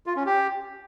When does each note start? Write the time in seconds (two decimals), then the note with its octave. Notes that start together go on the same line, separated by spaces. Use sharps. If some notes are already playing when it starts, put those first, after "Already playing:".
0.06 F4
0.16 C#4
0.26 G4